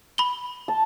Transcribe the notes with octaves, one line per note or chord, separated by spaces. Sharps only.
B5 G7
A5